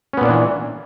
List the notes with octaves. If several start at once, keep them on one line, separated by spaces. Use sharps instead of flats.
A#2 E3 B3 C#4 D4